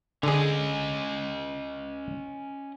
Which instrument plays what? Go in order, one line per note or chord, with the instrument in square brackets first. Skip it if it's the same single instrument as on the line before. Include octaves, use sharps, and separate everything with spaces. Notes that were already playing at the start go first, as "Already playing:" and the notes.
[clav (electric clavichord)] D3 G#4 [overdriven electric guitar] C#4 D#5